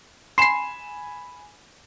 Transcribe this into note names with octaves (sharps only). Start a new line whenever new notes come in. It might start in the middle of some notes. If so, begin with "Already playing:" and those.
G#5 B5 C6 C7 E7